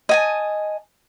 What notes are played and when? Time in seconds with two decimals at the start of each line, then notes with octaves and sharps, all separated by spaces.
0.09 D#5 G#5 A5